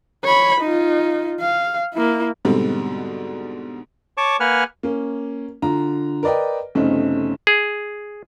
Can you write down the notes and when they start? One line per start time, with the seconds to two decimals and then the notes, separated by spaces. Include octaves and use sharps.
0.24 C#5 B5
0.61 D#4 F4
1.41 F5
1.94 A#3 E4
2.45 G#2 B2 D3 G3 C4
4.17 C#5 A5 C#6 D6
4.40 A#3 B4 F#5 G#5 F6
4.83 A#3 C#4
5.62 D3 F4 A#5
6.23 A#4 B4 D5 D#5 G5
6.75 G1 C#3 A3 C4 C#4 D#4
7.47 G#4